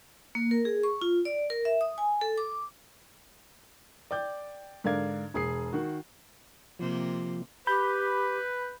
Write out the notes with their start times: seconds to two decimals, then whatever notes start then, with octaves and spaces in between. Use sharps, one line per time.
0.35 A#3
0.51 A#4
0.65 G#4
0.83 C#6
1.01 F4
1.25 D5
1.50 A#4
1.65 E5
1.81 D#6
1.98 G#5
2.21 A4
2.38 D6
4.11 D5 G5 D6 G6
4.84 G#2 D3 A#4 D5 F5 G#6
5.34 E1 G#4 D#6 C7
5.73 D#3 F#4
6.79 C3 F3 A#3 C5
7.67 G4 B4 B5 G6